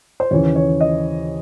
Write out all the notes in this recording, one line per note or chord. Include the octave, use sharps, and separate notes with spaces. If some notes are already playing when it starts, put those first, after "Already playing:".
C5
D#2 C#3 E3 C#5
C#5
D#5